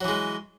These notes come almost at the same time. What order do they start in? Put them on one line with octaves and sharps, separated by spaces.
F#3 E3 G#3